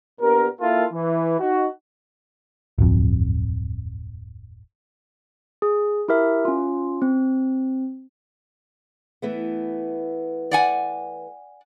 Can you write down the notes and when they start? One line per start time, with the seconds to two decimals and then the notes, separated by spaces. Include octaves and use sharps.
0.21 A#2 B3 D4 G4 A#4
0.60 A#3 E4 F4 A4
0.92 E3
1.39 D#4 F#4
2.78 D1 G1 F2
5.62 G#4
6.08 E4 G4 A#4 E5
6.45 C#4 F4
7.02 C4
9.22 E3 A3 B3
10.51 D5 F#5 G#5